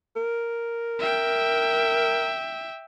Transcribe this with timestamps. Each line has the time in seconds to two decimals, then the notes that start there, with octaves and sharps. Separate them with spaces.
0.16 A#4
0.99 E5 G5